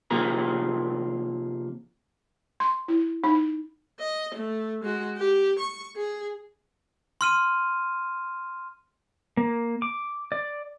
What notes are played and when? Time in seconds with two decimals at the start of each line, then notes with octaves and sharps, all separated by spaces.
0.11 C3 F3 A#3 G#4 A#4
2.60 C6
2.88 E4
3.24 D#4
4.00 D#5
4.35 A3
4.84 G#3 F#4
5.18 G4
5.59 C#6
5.96 G#4
7.21 C6 F6 D#7
9.37 A#3
9.82 D6
10.32 D5